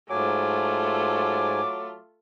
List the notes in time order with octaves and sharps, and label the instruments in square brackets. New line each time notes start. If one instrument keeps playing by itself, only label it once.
[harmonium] G#2 G#5 [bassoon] F#3 [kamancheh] A3 F4 [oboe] D6